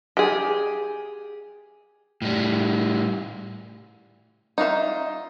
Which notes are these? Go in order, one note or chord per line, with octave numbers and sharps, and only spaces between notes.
G4 G#4
A2 G3
D#4 F4 F#4 E5